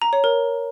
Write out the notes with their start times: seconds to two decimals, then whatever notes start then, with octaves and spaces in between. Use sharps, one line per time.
0.02 A#5
0.13 C#5
0.24 A#4